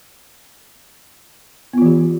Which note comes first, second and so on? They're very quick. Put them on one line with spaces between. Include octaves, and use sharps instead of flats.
B3 F4 E3 G4